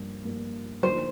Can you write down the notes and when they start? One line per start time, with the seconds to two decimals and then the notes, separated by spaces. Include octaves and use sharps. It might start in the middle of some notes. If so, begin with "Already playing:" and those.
Already playing: G2 F3 A#3
0.25 G2 F3 A#3
0.83 D3 F3 A#3 D#4 C5